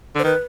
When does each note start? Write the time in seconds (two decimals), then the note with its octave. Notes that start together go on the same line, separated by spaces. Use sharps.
0.15 D3 C5
0.24 D#3 B4